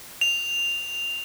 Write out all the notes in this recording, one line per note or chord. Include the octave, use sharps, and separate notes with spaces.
F7